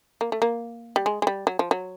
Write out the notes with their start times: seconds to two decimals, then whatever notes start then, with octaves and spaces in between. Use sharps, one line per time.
0.21 A#3
0.32 A3
0.42 A#3
0.96 G3
1.06 G#3
1.22 G#3
1.27 G3
1.47 F#3
1.59 F3
1.71 F#3